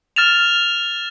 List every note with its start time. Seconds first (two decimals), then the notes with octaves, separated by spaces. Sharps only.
0.16 F6 A6 E7 F7